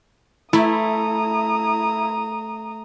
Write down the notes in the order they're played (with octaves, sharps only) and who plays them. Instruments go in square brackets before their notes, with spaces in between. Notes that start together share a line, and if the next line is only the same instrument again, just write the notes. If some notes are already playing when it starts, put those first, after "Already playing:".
[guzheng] A3 [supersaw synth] E4 [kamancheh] A#5 D#6